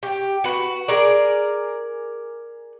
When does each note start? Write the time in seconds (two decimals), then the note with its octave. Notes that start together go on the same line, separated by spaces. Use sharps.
0.03 G4
0.44 F#4 B4
0.88 G#4 A#4 D5